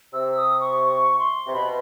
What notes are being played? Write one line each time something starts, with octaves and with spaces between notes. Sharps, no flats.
C3 E6
D#6
C#6
C#6
C6
C3
B2 B5